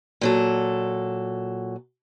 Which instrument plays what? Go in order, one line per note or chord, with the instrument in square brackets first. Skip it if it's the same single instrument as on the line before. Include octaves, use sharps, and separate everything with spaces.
[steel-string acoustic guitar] A#2 F#3 A4